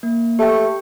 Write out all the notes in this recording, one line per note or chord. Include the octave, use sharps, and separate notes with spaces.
A#3
A3 G4 G5